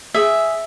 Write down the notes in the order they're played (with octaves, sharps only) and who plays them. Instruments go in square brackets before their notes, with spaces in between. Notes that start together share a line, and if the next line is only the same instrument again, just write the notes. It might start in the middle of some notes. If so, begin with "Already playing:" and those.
[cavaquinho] G#4 E5